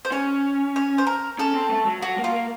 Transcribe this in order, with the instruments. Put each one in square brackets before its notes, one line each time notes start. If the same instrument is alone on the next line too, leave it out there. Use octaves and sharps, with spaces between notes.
[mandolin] C5
[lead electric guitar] C#4 [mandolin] C#5
[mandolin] C#5
C5
A#4
[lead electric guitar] C#4 [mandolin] A4
[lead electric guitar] C4
A3
F#3
[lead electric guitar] F#3 [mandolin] F#4
[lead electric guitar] A#3
[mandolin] F4
[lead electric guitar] A#3